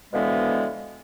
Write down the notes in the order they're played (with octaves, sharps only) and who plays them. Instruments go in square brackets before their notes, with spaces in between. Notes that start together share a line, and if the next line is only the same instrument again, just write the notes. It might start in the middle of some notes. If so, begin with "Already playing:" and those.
[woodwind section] B2 D3 E3 F3 G#3 B3